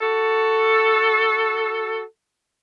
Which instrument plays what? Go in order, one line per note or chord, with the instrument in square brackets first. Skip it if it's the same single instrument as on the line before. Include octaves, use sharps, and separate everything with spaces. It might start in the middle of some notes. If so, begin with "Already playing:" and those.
[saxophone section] F#4 A4